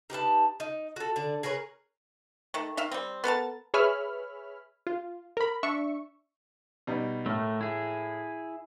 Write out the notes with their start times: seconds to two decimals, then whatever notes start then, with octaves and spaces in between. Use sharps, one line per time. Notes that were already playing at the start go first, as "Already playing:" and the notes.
0.10 D#4 G4 B4 A5
0.60 D#4
0.96 F#4 A4
1.16 D3 D5
1.43 G#4 A#4 B4 C#5
2.54 D#3 A3
2.77 D#3 E5 F5
2.92 G3 C4
3.24 B3 A4 A#4 A5
3.74 G#4 B4 C#5 E5 B5 F6
4.87 F4
5.37 A#4 B5
5.63 D4 E5 C#6
6.87 B2 G3 D#4
7.26 A2 A3 A#3 F6
7.61 E4 G#4